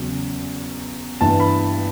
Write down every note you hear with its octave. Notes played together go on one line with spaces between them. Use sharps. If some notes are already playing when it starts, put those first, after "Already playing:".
Already playing: E2 C#3 F#3
G2 E3 G3 B3 A5
B5